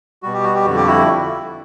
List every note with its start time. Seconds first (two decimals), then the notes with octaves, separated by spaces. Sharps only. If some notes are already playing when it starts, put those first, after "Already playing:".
0.23 B2 G3 F#4
0.34 G4
0.44 F#4
0.55 G4
0.65 F2 D3 G3 F#4
0.76 G4
0.87 E4 F#4